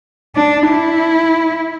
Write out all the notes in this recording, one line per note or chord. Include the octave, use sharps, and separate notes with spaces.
D4
E4